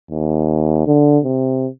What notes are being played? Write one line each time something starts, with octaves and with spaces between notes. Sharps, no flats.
D#2
D3
C3